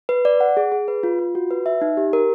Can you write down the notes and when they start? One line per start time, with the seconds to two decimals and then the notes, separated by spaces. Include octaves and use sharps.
0.09 B4
0.25 D5
0.40 F#5
0.57 G#4
0.72 G#4
0.88 B4
1.03 F4
1.19 F4
1.35 F#4
1.51 B4
1.66 E5
1.81 D#4
1.97 G4
2.13 A#4